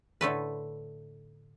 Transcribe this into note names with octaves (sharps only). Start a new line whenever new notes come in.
A2 D3 A3 B4